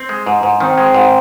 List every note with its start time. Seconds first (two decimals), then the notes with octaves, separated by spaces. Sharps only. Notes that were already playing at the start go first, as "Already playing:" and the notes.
Already playing: C4
0.09 G#3
0.27 G#2
0.43 G#2
0.60 D#3 C4
0.78 G#3
0.94 G#2